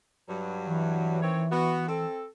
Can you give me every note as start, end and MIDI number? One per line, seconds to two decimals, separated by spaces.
0.28 1.21 43
0.28 1.21 54
0.66 2.04 52
1.22 1.44 51
1.22 1.44 60
1.22 1.44 73
1.52 1.87 59
1.52 1.87 66
1.88 2.26 60
1.88 2.26 69